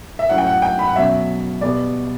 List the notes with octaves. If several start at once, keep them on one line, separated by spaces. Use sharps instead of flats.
E5
A2 F#3 C#4 F#5
G5
F#5
G5
B5
F#5
B2 F#3 C#4 E5
B2 G3 B3 D5